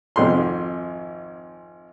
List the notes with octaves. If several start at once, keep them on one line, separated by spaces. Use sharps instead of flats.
G#1 F2 C6